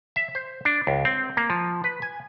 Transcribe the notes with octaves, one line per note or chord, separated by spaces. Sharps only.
E5
C5
D4
C#2
C4
A#3
F3
B4
G#5